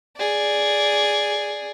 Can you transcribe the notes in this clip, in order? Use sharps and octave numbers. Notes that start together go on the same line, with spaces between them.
G#4 D5